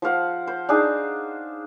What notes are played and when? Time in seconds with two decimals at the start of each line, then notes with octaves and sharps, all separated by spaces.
0.02 F3 C5 F5 F#5
0.47 C5
0.69 D4 D#4 G#4